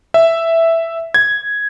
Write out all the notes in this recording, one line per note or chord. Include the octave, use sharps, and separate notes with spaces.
E5
G#6